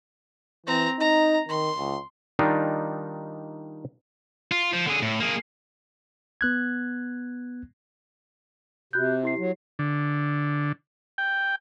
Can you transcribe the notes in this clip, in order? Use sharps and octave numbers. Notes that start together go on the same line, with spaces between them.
E3 C4 A#5
D#4 A#5
D#3 C6
C#2
D#3 G3 D4 D#4 F4
F4
F3
D3 G#4
A2
A#3 G#4
B3 F#6 G#6
C3 F#4 F#6 G6
E4 G4 C7
F#3
D3
G5